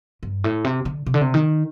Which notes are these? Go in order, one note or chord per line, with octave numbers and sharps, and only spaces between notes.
G2
A2
C3
D3
C3
D3
C3
D#3